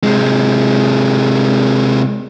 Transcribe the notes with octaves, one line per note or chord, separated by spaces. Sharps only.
C3 G#3